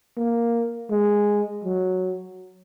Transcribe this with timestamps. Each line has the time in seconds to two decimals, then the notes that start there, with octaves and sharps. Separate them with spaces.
0.17 A#3
0.91 G#3
1.64 F#3